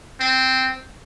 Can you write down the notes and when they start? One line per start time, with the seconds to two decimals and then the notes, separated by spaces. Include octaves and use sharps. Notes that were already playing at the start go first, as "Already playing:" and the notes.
0.20 C4